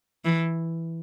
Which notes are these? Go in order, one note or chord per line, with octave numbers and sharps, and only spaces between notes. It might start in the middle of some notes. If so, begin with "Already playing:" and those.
E3